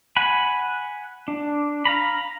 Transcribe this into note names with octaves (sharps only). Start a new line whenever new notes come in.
F#5 G#5 B5
D4
F5 A#5 B5